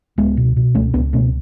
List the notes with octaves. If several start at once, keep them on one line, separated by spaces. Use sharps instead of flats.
C#2 G#3 B3
B2
B2
C#2 A3 C#4
C#2 B3 D4
B2 A3 C#4